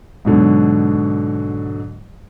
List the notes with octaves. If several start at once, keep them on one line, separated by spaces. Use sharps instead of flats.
G#2 B2 D3 F#3